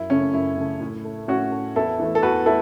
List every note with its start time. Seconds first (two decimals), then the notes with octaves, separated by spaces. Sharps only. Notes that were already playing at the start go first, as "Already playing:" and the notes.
Already playing: F#2 E4
0.10 C#3 A3 C#4
0.34 F#2 E4
0.57 C#3 A3
0.80 A2
1.04 A3
1.28 A2 C#4 F#4
1.51 A3
1.75 E2 E4 A4
2.00 E3 A3
2.15 A4
2.22 E2 F#4 B4
2.46 A3 E4 A4